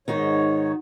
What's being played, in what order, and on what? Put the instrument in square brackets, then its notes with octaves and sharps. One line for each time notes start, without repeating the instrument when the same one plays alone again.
[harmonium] G#2 C#5 [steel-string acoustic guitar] D#3 D#4 F#4